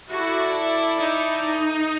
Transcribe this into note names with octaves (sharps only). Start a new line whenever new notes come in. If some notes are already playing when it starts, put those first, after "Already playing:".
E4 F#4 A4 D5
D#4